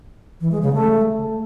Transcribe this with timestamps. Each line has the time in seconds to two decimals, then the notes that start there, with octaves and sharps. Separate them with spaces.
0.41 E3
0.51 G#3
0.62 C#3
0.73 A3